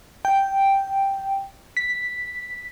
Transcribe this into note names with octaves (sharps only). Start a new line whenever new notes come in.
G5
B6